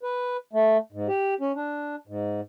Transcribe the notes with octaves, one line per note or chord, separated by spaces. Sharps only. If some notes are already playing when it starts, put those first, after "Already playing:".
B4
A3
G#2
G4
C#4
D4
G#2